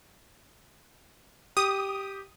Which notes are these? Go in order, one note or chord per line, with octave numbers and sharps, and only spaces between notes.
G4 D#6